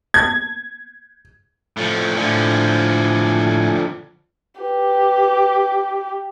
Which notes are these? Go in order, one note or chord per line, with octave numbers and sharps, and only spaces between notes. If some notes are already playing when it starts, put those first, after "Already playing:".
G#6
A2 F3
A2 D3 F3 E4 G#5
G4 B4